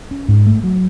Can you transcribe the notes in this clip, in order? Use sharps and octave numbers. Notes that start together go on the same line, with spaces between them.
C#4
G#2
A3
F#3